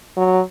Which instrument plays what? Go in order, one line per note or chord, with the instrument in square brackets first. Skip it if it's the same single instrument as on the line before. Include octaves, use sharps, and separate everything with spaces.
[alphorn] F#3